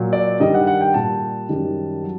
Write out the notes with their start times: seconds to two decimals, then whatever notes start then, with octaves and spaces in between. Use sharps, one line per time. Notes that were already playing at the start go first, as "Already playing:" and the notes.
Already playing: A#2 F#3
0.13 D5
0.40 G2 D#3 G3 D#5
0.54 F#5
0.67 F#5
0.81 G5
0.94 A#2 G3 A5
1.49 F#2 D#3 G3
2.04 F#3